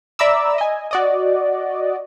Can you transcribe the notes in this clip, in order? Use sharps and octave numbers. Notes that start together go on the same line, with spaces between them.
D5 E5 A#5 B5 D6 E6
D#5 G#5
F#4 D5 D#5